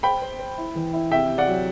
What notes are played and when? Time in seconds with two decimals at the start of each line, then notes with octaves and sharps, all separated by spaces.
0.03 C5 G5 B5
0.22 C5
0.39 C5
0.58 E4
0.75 E3
0.93 E4
1.11 C3 E5 G5
1.30 C3
1.38 D5 F#5
1.47 F#3